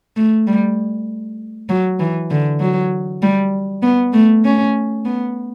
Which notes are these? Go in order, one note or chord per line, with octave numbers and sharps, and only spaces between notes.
A3
G3
F#3
E3
D3
F#3
G3
B3
A3
C#4
B3